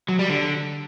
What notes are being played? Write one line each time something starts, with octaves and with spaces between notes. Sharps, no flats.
F#3
G3
D3